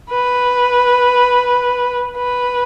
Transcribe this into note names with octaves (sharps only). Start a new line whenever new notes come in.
B4
B4